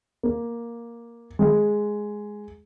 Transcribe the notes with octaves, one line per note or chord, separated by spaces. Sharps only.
A#3
G#3